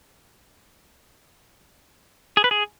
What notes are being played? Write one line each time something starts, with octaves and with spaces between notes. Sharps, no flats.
G#4
B4
G#4